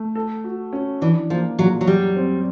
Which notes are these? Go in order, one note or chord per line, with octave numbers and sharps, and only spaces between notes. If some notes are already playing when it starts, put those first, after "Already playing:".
Already playing: A3
A4
F#4
C#4
E3 D4
F3 A#3
A#2 F#3
F#3
F#2 G3
C4